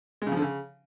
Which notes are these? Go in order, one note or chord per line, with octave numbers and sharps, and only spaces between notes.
G#3
C#3
F3
D3
C#3